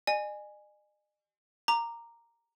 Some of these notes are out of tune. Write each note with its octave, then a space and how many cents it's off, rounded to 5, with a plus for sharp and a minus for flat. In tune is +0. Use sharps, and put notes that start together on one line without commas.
D#5 -45 G#5 +0
A#5 -5 D6 +15